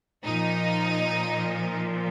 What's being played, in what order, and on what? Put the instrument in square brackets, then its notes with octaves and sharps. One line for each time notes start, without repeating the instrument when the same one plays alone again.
[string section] A#2 F3 D#4